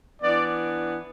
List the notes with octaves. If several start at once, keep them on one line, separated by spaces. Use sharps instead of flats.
E3 B3 D4 D5